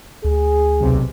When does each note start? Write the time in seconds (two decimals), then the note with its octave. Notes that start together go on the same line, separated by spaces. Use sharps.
0.25 D2 G#4
0.80 B1 C3